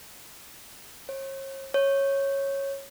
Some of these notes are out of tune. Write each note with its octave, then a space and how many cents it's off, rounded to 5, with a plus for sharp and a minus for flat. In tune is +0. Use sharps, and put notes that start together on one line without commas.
C#5 -40
C#5 -10